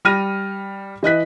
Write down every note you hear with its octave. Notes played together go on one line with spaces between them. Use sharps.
G3 F6 A#6 D#7
E3 D#5 F#6 B6